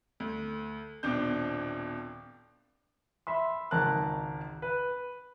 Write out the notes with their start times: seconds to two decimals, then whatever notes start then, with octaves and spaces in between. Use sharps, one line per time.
0.20 D2
1.03 D#1 B2 C4 D4 G6
3.27 E5 B5 C6
3.71 G#1 C#2 A#4 A5 F#6
4.62 B4